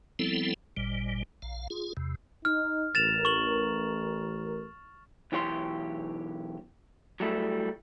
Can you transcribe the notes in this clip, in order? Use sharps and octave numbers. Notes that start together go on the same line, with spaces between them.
F3 G3 B3 C4 E4 A4
G#1 A#2 G3
A#1 F5
F4 G#4
E2 C3
D#4 F6
A1 A#4 A6 E7 F7
C#6 F#7
B1 E3 G4 C#5 D5 C6
F#3 G3 A3 E4